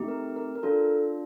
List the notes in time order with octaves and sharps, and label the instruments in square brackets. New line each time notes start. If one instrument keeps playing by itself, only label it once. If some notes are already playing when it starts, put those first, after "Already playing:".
Already playing: [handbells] A3 C4 D#4 G4
A#4
A#4
A#4
D4 F4 A4